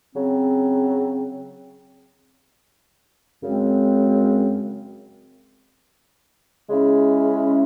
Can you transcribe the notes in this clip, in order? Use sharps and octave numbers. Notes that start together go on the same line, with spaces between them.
C#3 F#3 C4
F#2 C#3 G#3 C4
C#3 G#3 C#4 E4